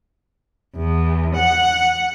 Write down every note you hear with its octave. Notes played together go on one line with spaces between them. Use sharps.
E2
F#5